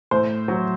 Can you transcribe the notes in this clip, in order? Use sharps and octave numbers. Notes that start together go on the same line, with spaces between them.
A2 C5
F#3